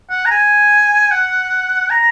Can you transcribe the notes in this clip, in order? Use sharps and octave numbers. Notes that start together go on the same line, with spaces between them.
F#5
A#5
G#5
F#5
A#5